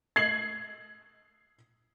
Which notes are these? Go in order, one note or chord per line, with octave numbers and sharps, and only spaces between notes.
G#6 C7 F#7